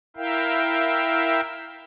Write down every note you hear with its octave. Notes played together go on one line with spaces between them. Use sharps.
E4 A#4 E5 F5 G5